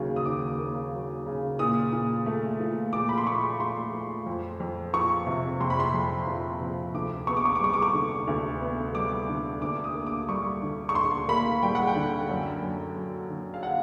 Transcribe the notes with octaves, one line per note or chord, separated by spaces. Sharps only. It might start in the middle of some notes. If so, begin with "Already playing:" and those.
Already playing: D#2 C#3 F#3 A#3
D#6
D#2 D6
A#3
F#3
C#3
A#2 D#6
A#2
A3
F3
A#2 D6
B5
C6
A#2 C#6
A3 C6
F3
F2
F2
F3 C#6
C3
F2 C6
B5
C6
F2
F3
C3
D2 D6
B3 C#6
D6
C#6
D6
G3 C#6
D6
C#6
D3
D2
B3
G3 D6
D3
D2 D6
D#6
A#3
D6
G3 C#6
D3
C#6
D2 C6
A#3 B5
G3 G5
F#5
G5
D3
F#2
F#2
F#3
D3
F5
F#5